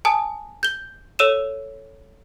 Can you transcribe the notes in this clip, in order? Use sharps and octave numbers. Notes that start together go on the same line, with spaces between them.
G#5 A5 D#6
G6 G7
A4 C#5 E6 D#7 E7